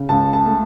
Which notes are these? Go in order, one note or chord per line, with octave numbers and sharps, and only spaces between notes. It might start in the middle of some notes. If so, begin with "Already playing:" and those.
Already playing: C#3
C#2 A5
A5
A3